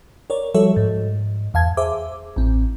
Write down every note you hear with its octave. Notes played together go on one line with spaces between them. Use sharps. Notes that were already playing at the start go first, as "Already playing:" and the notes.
A#4 C#5 D5
F3 G3 F#4 A4 C#5 E5
G#2
E2 F5 A5 G#6
G#4 C5 E5 D6
A1 C4